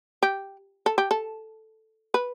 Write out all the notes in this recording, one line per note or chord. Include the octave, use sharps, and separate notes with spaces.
G4
A4
G4
A4
B4